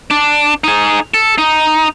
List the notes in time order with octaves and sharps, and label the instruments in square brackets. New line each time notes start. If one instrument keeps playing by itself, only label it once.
[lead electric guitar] D4
D#4 G#4
A4
D#4